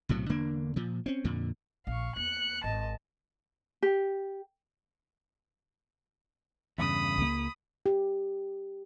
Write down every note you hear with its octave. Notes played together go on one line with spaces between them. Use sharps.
B1 A2 C3 F#3
E1 D3 A#3 D4
A#2 F3
C4 C#4
F2 A#2 D3
A#1 F5 C#6
E2 A#3 F#6 C#7
G#1 D#5 A5
G4
E2 G2 C#3 B5 D#6
C#2 A#3
G4